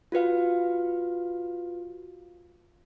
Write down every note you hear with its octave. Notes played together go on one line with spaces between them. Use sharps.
F4 F#4 B4 F5